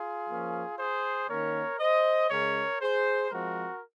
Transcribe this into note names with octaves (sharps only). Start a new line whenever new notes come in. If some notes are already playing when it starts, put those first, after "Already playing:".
Already playing: F4 G#4
F3 A#3 C#4
G#4 C5
D#3 A#3 C#4 A#4 C#5
C5 D#5
C#3 G#3 C#4 A#4 C#5
G#4 C5
F3 G#3 C4 F#4 A#4